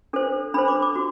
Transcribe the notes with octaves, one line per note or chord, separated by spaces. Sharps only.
D4 A4 C5
D4 A4 C5 B5
D6
D6
F#4